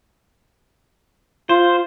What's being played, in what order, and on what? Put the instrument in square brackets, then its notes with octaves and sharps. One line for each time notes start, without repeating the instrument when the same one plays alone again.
[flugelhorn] F4 [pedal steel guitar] C5